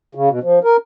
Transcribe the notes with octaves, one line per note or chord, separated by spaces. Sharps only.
C#3
B2
F3
A#4